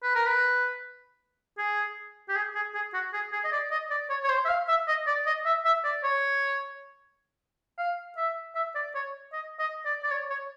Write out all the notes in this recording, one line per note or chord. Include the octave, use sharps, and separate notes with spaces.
B4
A#4
B4
G#4
G4
G#4
G#4
G#4
F#4
G#4
G#4
D#5
D5
D#5
D5
C#5
C#5
C5
E5
F5
E5
D#5
D5
D#5
E5
E5
D5
C#5
F5
E5
E5
D5
C#5
D#5
D#5
D5
D5
C#5
C#5